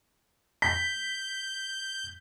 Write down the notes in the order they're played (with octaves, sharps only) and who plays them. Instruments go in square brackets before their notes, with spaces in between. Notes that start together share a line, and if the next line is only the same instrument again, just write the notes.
[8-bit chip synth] G6 [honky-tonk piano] B6